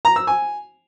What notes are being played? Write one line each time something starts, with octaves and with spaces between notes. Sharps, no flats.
A#5
E6
G#5